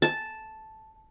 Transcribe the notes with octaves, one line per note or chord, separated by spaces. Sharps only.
A5